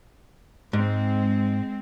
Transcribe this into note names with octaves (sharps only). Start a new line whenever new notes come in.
G#2 G#3 C4